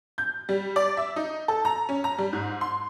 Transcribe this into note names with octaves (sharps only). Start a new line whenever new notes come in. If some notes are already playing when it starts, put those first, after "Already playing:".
G6
G3
D5
E5
D#4
A4
A#5
C#4
A#5
G3
G#2
C6